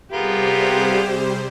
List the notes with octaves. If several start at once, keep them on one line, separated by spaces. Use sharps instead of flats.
C3 G3 B3 F4 G4 G#4 A#4 C5